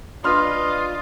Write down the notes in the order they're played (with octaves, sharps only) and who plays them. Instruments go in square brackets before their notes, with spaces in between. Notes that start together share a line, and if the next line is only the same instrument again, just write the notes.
[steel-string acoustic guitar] D4 B4 [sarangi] F4 [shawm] D#5 [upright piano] C6 F6